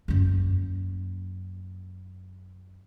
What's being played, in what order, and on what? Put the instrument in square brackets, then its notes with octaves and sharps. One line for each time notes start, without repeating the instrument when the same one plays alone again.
[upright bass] F#2 A#3